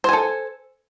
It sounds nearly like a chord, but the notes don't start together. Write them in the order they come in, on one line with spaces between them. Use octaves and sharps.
C5 G#5 A4